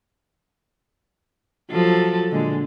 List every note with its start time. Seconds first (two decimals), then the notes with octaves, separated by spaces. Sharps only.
1.70 F3 F#3 A4
2.31 A#2 D3 G#3